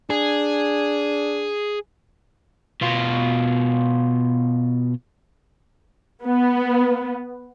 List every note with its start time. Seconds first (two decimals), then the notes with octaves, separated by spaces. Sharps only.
0.10 D4 G#4
2.81 B2 F4
6.24 B3